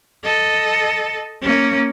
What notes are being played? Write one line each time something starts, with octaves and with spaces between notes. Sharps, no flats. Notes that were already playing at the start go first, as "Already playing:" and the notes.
A4 D#5
A#3 C#4